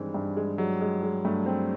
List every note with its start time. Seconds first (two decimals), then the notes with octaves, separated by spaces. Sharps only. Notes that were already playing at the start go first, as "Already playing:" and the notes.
Already playing: G2 D#3 E3 G#3 C4
0.14 G2
0.37 G#3
0.58 F#3 G#3
0.81 G#3
1.03 G#3
1.25 G2 A3
1.46 C4